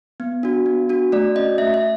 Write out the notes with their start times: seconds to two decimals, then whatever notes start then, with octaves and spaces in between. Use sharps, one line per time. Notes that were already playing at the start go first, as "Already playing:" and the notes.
0.20 B3
0.43 D4 F#4
0.66 B3
0.89 D4 F#4
1.12 A3 D5
1.35 C#4 F#4 D#5
1.58 A3 E5
1.74 E5